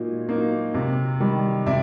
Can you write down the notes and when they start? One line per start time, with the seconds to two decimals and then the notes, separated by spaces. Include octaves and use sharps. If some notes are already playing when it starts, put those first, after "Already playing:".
Already playing: A#2 F#3 A#3 D#4
0.28 F#3 A#3 D#4
0.74 C3
1.20 D#3 G3
1.66 C3 D5 E5